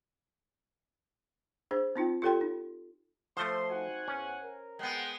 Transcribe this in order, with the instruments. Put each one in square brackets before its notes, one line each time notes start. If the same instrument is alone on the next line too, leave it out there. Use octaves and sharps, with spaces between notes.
[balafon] D4 G#4 C5
C4 D#4 F4 G5
F4 G4 A4 C#5 G5 C6
D#4
[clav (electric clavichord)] F3 A3 [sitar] C5 [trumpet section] C6
[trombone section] C4 D#4 F#4 [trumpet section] F#5 G#5
[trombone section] E2 [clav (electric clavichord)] C#4
[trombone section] A#4
[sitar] G#3 B3 [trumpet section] G#4 F#5 G5